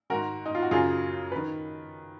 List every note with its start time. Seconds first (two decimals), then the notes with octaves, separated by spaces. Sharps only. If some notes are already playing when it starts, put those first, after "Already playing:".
0.10 G#2 D#3 F#4 A#4
0.46 D#4
0.55 F4
0.62 F#4
0.71 F#2 C#3 F4 G#4
1.32 D#3 B4